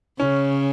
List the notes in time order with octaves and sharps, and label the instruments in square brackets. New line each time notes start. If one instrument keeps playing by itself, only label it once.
[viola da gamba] C#3 [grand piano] C#4